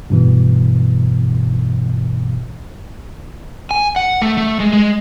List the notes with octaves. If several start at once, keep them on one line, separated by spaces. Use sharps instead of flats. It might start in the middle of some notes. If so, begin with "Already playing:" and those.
G2 B2 E3
G#5
F#5
A3
A3
G#3
G#3